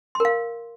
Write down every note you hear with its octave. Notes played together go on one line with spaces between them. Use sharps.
A#4 F5 C6